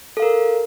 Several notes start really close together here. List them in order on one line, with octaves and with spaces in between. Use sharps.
A4 F5 A#4